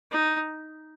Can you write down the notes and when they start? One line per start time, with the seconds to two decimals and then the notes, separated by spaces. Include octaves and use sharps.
0.11 D#4